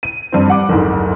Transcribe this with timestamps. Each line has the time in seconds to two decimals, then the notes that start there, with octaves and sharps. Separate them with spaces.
0.03 D#7
0.32 G2 C4
0.48 G3 F#5 D6
0.69 F#1 D2 G#2